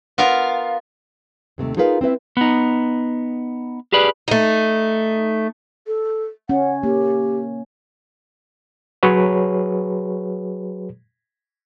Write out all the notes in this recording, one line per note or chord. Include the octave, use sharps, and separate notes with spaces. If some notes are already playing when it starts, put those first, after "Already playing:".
B3 F4 A#4 F5
D#2 C3 A3
D#4 F4 G#4 A#4 B4 F5
C4 E4 B4 E5
B3 D#4
G4 G#4 B4 D5
A3 D#4
A4
C#4 F#5
A#3 G4
F#3 F#4 G#4 B4 C#5